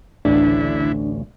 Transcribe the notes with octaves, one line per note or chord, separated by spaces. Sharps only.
A1 D2 D3 D4 E4